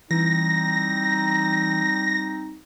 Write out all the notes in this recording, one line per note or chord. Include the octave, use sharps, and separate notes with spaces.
E3 G3 C4 D#4 A#6